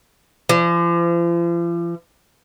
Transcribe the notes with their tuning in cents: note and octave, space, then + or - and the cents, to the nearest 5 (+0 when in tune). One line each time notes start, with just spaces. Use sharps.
F3 -40